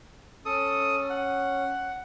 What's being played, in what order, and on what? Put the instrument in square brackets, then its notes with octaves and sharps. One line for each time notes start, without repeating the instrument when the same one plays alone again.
[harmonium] C#4 [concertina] A4 D#6
[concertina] F#5